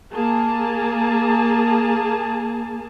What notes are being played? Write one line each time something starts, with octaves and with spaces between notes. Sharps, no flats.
A#3 G#4 A5